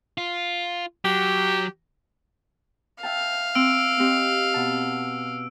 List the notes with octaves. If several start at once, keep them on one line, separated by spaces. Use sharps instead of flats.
F4
F#3 G4
E5 F5 G5 A5
C4 E6 D7
C4 G4 D#5
B2 A5